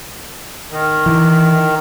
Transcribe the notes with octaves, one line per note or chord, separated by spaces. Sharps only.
D#3
E3